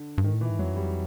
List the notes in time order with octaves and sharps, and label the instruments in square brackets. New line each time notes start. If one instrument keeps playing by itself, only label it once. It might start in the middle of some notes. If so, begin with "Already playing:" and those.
Already playing: [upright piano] D3
[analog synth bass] G2
[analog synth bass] G#2 [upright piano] D#3
[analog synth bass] A2
[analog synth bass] A#2 [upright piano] E3
[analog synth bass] G#2
[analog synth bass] F2 [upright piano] F#3
[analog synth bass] F#2
[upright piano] G3
[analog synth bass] F2